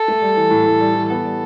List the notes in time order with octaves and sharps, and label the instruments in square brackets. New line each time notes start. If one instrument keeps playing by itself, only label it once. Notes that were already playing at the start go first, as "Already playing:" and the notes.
Already playing: [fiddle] A4
[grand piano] A3
G3
E3
A2
A2
G3
E3
[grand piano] B3 [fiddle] A4
[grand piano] G3